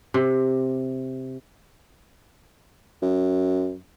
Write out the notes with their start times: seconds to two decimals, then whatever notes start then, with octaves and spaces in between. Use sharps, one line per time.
0.14 C3
3.03 F#2